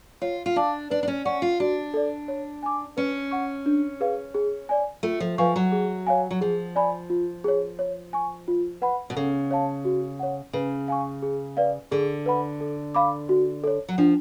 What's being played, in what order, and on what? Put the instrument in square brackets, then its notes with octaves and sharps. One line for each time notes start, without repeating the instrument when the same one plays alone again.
[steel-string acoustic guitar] F4 [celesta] C#5
[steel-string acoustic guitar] F4
[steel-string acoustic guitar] D4 [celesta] F5 A5 D6
[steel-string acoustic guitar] D4 [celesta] B4
[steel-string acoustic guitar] D4
C#4
[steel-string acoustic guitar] C#4 [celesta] D5 F#5 C#6
[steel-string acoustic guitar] F4
[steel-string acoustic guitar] D4 [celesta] F#4
[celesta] A4 D5
C#5
G#5 D6
[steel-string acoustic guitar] C#4 [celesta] B4
[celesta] F#5 C#6
D4
G#4 B4 F5
G#4
D5 G#5
[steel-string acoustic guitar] A3 [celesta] F4
[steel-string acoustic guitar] F3
[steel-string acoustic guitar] F3 [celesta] B4 F5 G#5 C#6
[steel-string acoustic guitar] F#3
[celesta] G#4
C#5 F5 G#5
[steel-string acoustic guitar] F#3
[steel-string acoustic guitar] F3 [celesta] G#4
[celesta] D5 G#5 B5
F4
G#4 C#5
C#5
G#5 C#6
F4
B4 F#5 B5
[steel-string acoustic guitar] B2
[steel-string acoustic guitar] C#3 [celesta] A4
[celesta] C#5 F5 A5
F#4
C#5 F#5
[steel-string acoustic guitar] C#3 [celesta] B4
[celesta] F5 G#5 C#6
G#4
B4 D5 F5
[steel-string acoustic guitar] D3 [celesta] G#4
[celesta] B4 F#5 B5
A4
F5 B5 D6
F#4
A4 C#5
[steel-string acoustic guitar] F#3
[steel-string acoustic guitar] F3 [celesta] D4